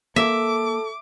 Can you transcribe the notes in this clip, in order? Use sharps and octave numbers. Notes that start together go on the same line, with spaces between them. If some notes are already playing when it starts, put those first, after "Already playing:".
A#3 A4 E5 D6